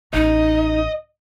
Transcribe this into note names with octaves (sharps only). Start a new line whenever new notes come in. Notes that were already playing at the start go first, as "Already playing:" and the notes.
A1 C#4 D#4 D#5